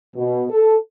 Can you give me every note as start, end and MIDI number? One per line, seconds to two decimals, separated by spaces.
0.15 0.44 47
0.49 0.75 69